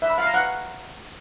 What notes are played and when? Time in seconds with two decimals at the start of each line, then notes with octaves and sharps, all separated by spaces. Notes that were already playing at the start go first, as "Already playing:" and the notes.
0.02 E5
0.10 B5
0.18 F5
0.26 A#5
0.34 F#5